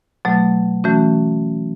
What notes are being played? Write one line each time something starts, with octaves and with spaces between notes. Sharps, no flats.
B2 F#3 A3
E3 A3 C#4 F#4